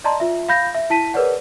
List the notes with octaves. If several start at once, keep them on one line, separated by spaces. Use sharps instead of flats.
D5 D#5 A5 A#5 C6
F4 E5
F5 B5 G6 A#6
E5
E4 A5 B6 D#7
G#4 A#4 B4 C#5 D5 F#5